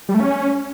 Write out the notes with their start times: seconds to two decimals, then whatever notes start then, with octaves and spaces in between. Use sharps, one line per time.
0.09 G3
0.14 A3
0.20 C#4